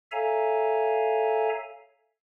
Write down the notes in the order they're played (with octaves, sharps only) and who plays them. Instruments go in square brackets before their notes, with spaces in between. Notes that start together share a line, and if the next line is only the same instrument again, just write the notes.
[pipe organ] A4 C#5 E5 F5 G#5 A#5